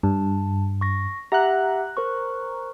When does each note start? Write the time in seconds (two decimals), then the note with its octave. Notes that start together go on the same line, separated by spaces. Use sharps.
0.03 G2 A5
0.81 C#6 A#6
1.32 G4 E5 F#5 A#5 F#6
1.97 A#4 C5 C#6